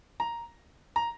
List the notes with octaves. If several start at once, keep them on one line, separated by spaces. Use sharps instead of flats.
A#5
A#5